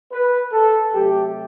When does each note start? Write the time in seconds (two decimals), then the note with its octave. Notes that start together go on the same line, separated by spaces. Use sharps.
0.12 B4
0.52 A4
0.93 C3 F#3 A3 G4